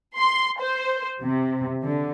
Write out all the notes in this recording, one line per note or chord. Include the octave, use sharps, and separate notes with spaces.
C6
C5
C3
D3